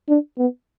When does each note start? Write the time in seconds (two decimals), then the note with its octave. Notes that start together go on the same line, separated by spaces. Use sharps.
0.08 D4
0.38 B3